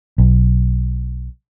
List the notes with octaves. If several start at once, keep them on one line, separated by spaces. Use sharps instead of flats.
B1